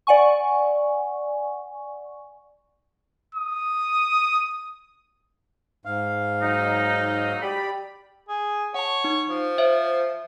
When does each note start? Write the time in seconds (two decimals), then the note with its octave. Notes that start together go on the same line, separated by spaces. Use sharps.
0.07 D5 F#5 G#5 C#6
3.35 D#6
5.85 G#2 F5
6.42 F#3 D#4
7.42 G4 D5 B5
8.29 G#4
8.74 C#5 F#5 A5
9.04 D#4
9.29 F3
9.58 C5 C#5 E5